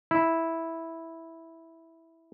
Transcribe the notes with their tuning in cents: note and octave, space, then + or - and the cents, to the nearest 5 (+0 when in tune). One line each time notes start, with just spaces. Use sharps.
E4 -5